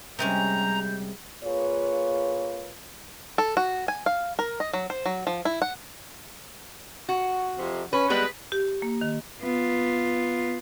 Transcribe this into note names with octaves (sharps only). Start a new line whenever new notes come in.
C3 G3 G#3 C#4 A#5 G6
A#3 F4 G#4 B4 C#5
A4
F#4
G#5
F5
A#4
D#5
F#3
C5
F#3
F3
E4
F#5
F#4
F2 C3
C#4 B4
G3 G#3 B3 B4
G4
A#3
D#3
B3 F4